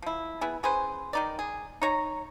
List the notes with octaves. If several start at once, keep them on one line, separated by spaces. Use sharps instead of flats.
F3 E4
B3 E4 G#4
C#4 G#4 B4 C5
D#3 D#4 D5
G#4
D#4 C#5 A#5